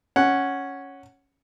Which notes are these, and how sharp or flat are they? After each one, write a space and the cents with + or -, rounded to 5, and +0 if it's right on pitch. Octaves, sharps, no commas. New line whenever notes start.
C#4 +0 F#5 +0